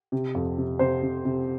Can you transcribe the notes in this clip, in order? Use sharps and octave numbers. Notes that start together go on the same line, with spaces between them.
C3
F2
C3
C3 C5
C3
C3